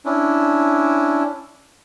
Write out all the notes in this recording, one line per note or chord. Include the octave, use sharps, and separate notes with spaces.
C#4 D4 E4